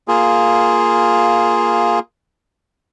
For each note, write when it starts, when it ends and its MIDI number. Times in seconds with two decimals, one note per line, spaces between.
0.08 1.99 58
0.08 1.99 65
0.08 1.99 68